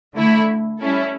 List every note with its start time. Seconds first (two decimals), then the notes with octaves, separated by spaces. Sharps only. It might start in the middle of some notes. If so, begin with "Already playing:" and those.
0.16 D3 A3 E4
0.80 G3 C#4 E4 A4